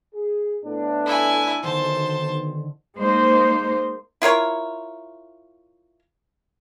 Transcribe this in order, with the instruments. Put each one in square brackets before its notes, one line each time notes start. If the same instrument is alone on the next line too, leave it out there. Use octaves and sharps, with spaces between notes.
[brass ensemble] G#4
A2 B3 D4
[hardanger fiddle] E4 G#5
[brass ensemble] B1 [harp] D3 D#3 [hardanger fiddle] C5 A5
[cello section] G#3 A#3 D#4 C5
[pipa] E4 F4 A#4 C#5